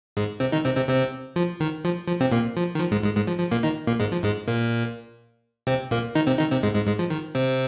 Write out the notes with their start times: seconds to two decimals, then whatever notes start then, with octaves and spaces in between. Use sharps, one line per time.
0.17 G#2 G#3
0.40 C3 C4
0.52 D#3 D#4
0.65 C3 C4
0.76 C3 C4
0.89 C3 C4
1.36 F3
1.60 D#3
1.85 F3
2.08 F3
2.20 C3 C4
2.32 A#2 A#3
2.57 F3
2.75 D#3
2.80 F3
2.91 G#2 G#3
3.04 G#2 G#3
3.16 G#2 G#3
3.27 F3
3.39 F3
3.52 A#2 A#3
3.63 D#3 D#4
3.87 A#2 A#3
4.00 G#2 G#3
4.12 F3
4.23 G#2 G#3
4.48 A#2 A#3
5.67 C3 C4
5.91 A#2 A#3
6.15 D#3 D#4
6.27 C3 C4
6.39 D#3 D#4
6.51 C3 C4
6.63 G#2 G#3
6.75 G#2 G#3
6.87 G#2 G#3
6.99 F3
7.10 D#3
7.35 C3 C4